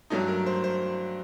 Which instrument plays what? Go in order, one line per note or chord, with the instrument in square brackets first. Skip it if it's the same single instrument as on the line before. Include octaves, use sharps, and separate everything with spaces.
[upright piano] G2 F#3 A3 D#4
A#4
C5
C5